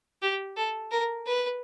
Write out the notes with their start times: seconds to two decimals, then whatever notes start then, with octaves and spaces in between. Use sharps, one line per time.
0.22 G4
0.57 A4
0.91 A#4
1.26 B4